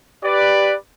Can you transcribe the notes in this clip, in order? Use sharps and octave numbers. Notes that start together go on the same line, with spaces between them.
G4 B4 D5